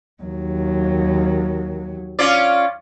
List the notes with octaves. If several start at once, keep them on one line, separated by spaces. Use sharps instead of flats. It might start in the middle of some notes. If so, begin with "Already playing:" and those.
D#2 F#3
C#4 F4 D5